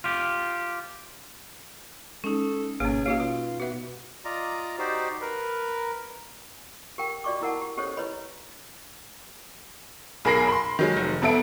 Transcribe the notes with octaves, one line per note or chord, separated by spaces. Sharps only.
F4 G4
G#3 C#4 D#4 A4
G#1 B2 A#3 C#4 G#4 C#5
A#3 C#4 D#4 F#4 G#4 C#5 F5
B2 F4
B3 F#4 E5
F4 D5 D#5 A#5
D#4 F#4 G4 C5 D5
A#4 B4
G4 A#4 G5
F#4 D5 D#5 C#6 D6
E4 A#4 F#5 A5
G4
C#4 G4 A4 C5 C#5 D#5
E4 B4 C#5 D#5 B5
B1 G#4 A#4 B5 A#6 C7
B5 C6
D#3 F#3 G#3
F1
G#1 B3 A4 E5 D7